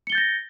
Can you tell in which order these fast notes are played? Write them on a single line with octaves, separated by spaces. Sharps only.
C#7 G7 A6 G6 A#6